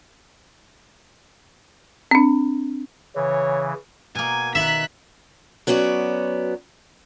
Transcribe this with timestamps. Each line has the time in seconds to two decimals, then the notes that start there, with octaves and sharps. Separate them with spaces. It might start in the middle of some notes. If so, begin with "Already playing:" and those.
2.11 C4 D4
3.16 C#3 E3 C#5
4.15 B2 A#3 G#5
4.55 D#3 B4 E5 B5 F#6 B6
5.67 F#3 B3 C#4 F#4 D5